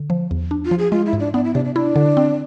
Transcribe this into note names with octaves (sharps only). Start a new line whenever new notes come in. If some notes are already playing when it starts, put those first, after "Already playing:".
Already playing: D3
F3
E2
D4
F4
F3
G#4
G#3 F4
E4
G#2
D4
B3 D4
E4
C3 D4
D4
D4 E4
D3
C4